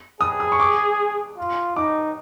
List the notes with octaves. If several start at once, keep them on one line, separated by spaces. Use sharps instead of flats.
G#4 D#6
D#6
C#6
D6
F4
D#4 D6